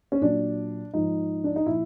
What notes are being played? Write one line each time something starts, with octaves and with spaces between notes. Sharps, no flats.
C#4
A#2 F#3 D4
G#2 F3 D#4
D4
D#4
A#2 F3 E4